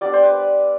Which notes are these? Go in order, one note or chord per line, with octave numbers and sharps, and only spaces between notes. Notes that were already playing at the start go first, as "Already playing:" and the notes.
G3 B3 D4 D5
C5
B4